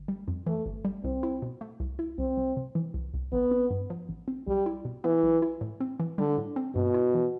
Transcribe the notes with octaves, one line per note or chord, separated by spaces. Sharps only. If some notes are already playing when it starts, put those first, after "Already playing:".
Already playing: G1
G3
F2
E3 A3
G1
G3
C2 C4
E4
B2
A3
C2
E4
C2 C4
C2
C3
E3
C2
C2
A1 B3
C4
G2
F3
A1
C4
B1 G3
E4
B2
E3 B3
B1
E4
A2
C4
E3
D3 G3
A2
C4
G2 B2
E4
E3